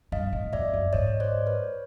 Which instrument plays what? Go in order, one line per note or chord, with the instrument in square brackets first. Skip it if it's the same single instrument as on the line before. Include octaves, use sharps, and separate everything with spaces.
[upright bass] G2 [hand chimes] D#5 F5
[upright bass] A2
[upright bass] F2 [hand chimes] D5 E5
[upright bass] F#2
[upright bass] G#2 [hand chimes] C#5 D#5
[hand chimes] C5 D5
B4 C#5